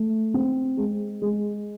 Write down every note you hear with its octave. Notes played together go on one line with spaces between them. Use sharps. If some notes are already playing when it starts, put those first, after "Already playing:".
Already playing: A3
C4
G#3
G#3